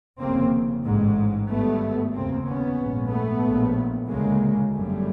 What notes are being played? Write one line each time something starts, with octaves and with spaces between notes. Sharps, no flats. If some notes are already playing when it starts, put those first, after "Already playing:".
F1 D#2 C#3 A#3 C4
A1 G#2
G#1 G2 A3 B3
F1 D#2 C#3 A#3 C4
B3 C#4
A#1 G#2
A3 B3
A#1 A2
D2 C#3 G#3 A#3
G1 F#2 C#3 G3 A3